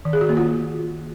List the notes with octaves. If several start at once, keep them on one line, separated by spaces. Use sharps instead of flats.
D#3
G#4
F#4
A#3
F4